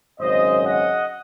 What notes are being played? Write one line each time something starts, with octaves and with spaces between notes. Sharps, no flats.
G#1 F#2 C#3 C5 D#5
D#5 F#5